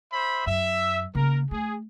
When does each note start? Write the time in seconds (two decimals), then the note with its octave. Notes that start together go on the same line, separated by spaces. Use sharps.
0.12 C5 E5 B5
0.46 F#2 E5
1.15 C#3 A#3 A#4
1.51 A3 G#4